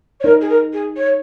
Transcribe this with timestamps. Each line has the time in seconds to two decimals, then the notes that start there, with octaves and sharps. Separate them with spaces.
0.20 C#5
0.24 D#4 A#4
0.40 G#4
0.49 A#4
0.72 G#4
0.96 C#5